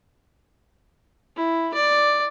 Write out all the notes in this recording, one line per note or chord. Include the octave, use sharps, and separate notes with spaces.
E4
D5